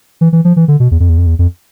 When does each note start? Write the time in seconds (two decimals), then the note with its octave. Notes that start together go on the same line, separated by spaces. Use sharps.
0.21 E3
0.33 E3
0.45 F3
0.56 E3
0.68 D3
0.80 B2
0.91 E2
1.00 F2
1.09 E2
1.18 F2
1.26 E2
1.39 F2